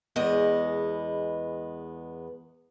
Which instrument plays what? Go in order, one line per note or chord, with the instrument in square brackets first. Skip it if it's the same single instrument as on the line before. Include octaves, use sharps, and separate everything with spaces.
[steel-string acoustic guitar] E2 G#3 B3 D#5